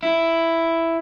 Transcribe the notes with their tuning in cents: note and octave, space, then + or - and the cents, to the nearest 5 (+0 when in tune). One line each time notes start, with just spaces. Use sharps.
E4 +5